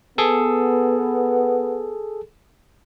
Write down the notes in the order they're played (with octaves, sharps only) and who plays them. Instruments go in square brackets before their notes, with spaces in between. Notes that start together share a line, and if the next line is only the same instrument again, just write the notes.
[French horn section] B3 [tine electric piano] G#4 A4